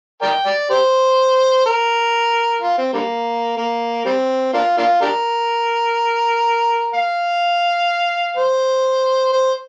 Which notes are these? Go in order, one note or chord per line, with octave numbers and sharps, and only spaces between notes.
A#4 D5 G5
D5
G4 C5
A#4
F4
C4
D3 G3 A#3
A#3
G3 C4
A#3 D4 F4
A#3 D4 F4
D4 G4 A#4
F5
C5
C5